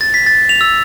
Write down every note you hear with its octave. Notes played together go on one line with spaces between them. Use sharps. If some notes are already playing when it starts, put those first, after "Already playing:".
A6
B6
A6
F7
E6